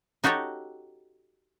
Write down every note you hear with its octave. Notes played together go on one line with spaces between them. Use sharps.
D#4 F#4 G4 A4 C#5